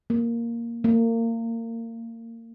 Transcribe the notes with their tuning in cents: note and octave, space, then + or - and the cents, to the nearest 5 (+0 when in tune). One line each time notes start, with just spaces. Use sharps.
A#3 +0
A#3 -30